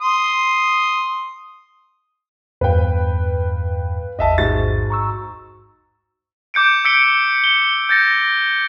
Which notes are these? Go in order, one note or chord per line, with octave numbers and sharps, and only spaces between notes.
C6 D#6
E2 G2 B4 F5 G5
A1 E2 D#5 E5 A5
G#2 F#4 A6
A#5 C#6 E6
D6 G6 C#7 D7
E6 G6 B6 C#7 D7 G7
G7
G6 A6 A#6 C#7